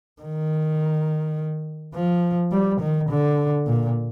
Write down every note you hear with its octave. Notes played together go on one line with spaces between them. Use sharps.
D#3
F3
G3
D#3
D3
A#2